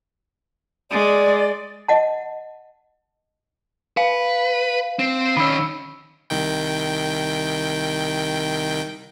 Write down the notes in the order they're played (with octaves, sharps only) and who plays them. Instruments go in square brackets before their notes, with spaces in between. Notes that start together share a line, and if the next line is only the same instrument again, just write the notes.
[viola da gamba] G#3 [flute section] D5
[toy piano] D#5 F#5 A5
[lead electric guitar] B4 [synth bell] F5
[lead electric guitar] C4
[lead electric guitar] D#3 C#4 [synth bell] B5 E6
[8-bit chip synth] C2 D#3 G5